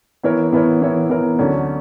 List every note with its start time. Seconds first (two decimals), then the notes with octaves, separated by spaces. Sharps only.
0.23 E3 B3 E4 A#4 C#5
0.53 E3 B3 E4 A#4 C#5
0.81 E3 B3 E4 A#4 C#5
1.09 E3 B3 E4 A#4 C#5
1.39 D2 D3 F#3 C#4